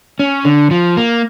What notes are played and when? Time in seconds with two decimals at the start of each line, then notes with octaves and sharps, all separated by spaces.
0.19 C#4
0.45 D3
0.71 F3
0.97 A#3